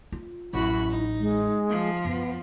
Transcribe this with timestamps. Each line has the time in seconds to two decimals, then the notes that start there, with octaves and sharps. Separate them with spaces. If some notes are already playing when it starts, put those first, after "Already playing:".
0.12 F4
0.53 A1 F#2 E4 F#4 B5
0.89 D#4
1.20 G#3
1.70 F3
2.05 F#2 B3